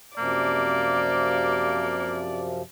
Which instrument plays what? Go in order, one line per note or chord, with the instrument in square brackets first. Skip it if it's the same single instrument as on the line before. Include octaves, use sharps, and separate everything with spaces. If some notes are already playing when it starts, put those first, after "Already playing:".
[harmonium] F#2 C3 F3 [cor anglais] A#3 [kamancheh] D5